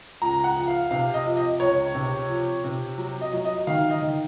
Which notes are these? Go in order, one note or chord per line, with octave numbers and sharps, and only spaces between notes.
C#2 A#5
F#5
F3
F5
C3 F5
D#5
F3
D#5
C#2 C#5
C3
F3
C3
F#3
D#5
F#3
D#5
D#3 F5
D#5
D#3